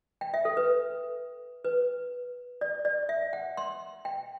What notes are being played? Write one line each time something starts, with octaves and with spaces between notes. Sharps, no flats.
G5
E5
A4
B4
B4
D5
D5
E5
F#5
C6
G5